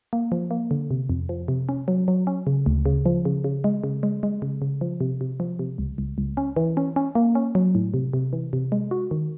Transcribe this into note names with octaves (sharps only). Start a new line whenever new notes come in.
A#3
F3
A#3
D3
C3
F2
F3
C3
C#4
F#3
F#3
C#4
C#3
D2
C#3
F3
C#3
C#3
G#3
C#3
G#3
G#3
C#3
C#3
F3
C3
C3
F3
C3
C#2
C#2
C#2
C#4
E3
C#4
C#4
A#3
C#4
F#3
A2
C3
C3
E3
C3
G#3
F#4
D#3